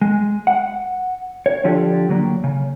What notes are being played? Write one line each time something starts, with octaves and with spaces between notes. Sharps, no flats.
G#3
F#5
C#5
D3 F3 F4 G4 A4 D5
D3 F#3 A#3
C#3